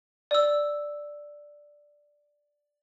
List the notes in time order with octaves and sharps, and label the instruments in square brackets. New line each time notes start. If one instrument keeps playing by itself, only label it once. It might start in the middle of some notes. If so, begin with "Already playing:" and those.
[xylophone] D5 E6